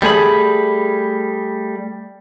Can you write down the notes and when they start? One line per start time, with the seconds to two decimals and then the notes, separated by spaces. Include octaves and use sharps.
0.02 G3 A3 G#4 B5